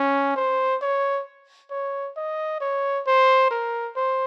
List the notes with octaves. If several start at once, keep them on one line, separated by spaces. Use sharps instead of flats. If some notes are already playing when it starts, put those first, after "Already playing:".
Already playing: C#4
C5
C#5
C#5
D#5
C#5
C5
A#4
C5